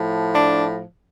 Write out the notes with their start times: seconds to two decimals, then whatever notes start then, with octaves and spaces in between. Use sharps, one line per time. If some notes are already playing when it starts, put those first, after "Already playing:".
Already playing: A2 F3
0.35 D4